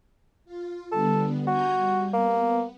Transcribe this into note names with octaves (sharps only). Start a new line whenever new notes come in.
F4
D3 G3 B3 A4
F#4 G#5 A#5 G6
G3
A#3 B3